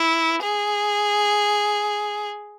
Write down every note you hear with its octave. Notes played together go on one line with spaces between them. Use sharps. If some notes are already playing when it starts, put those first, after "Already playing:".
Already playing: E4
G#4